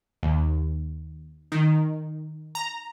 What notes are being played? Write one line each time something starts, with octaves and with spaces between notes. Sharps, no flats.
D#2
D#3
A#5